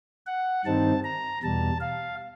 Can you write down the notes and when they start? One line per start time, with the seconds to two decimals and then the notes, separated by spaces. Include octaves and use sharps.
0.26 F#5
0.65 G2 D#3 G3 C4 D#4 A5
1.04 A#5
1.43 E2 B2 G3 A5
1.81 F5